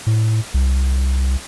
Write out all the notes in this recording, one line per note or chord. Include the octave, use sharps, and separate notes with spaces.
A2
C2